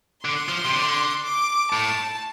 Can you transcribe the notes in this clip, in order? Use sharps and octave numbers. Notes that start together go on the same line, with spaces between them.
D3 C6
F3
C3
D3
D6
A2 A5